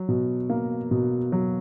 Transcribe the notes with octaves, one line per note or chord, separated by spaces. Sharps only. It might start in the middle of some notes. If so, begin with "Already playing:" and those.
Already playing: F#3
B2
A#3
B2
F#3